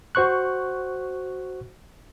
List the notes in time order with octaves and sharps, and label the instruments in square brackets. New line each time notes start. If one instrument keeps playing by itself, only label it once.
[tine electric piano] F#4 C5 C#6 F#6